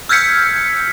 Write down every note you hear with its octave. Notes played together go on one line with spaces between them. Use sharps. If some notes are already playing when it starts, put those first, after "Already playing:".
E6 F6 G6 G#6 B6 C#7